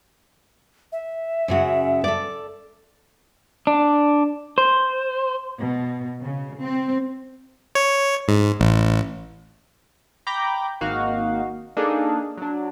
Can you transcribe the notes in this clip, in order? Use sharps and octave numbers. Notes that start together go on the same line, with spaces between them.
E5
F#2 C#3 F#4
A4 D5
D4
C5
B2
C#3
C4
C#5
G#2
A1
G5 A#5 B5 D6 G6
G#1 A#3 D#4 F#4 F5
A#3 D4 D#4 G#4 A4
F#3 D4